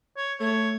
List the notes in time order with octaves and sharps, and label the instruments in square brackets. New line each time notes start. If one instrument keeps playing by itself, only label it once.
[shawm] C#5
[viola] A3 [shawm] C#5